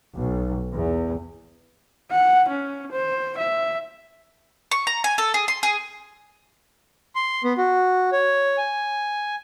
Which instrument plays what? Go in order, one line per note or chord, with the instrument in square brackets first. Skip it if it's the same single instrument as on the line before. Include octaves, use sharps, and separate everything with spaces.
[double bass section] B1
E2
[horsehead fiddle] F#5
C#4
C5
E5
[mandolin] C#6
A#5
G#5
A4
G#4
C6
G#4
[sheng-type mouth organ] C6
B3
F#4
C#5
G#5